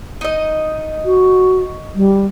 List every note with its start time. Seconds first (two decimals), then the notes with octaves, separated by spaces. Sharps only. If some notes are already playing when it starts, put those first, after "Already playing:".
0.21 D#4 D#5
1.05 F#4
1.95 G3